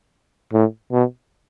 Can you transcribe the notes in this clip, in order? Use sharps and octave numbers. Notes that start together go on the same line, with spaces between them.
A2
B2